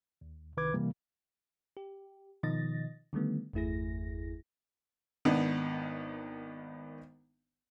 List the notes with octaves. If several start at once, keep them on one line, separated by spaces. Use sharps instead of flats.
D#2
C2 D#3 B4 D6 G#6
C3 E3 G3 A#3
G4
B2 D#3 F3 D#5 A6 A#6
D3 D#3 G3 A3 B3
G1 E2 A3 E4 G#4 A#6
G#1 D#3 B3 D4